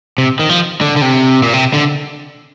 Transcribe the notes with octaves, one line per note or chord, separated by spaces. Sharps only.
C3
D#3
F3
D3
D3
C3
A#2
C3
D3